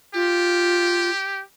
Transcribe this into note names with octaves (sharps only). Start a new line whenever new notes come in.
F4 G4